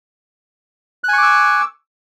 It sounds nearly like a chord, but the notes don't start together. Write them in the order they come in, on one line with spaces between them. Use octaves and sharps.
F#6 G#5 C#6 D6 E6